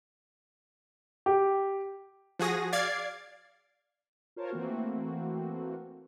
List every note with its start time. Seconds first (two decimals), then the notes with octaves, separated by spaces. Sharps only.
1.26 G4
2.39 F3 F#4 G#4 D#6 A#6
2.73 D5 F5 D6 G#6 A6 C7
4.36 F4 A#4 C5 C#5 A5
4.50 E3 A3 A#3 C4 F#4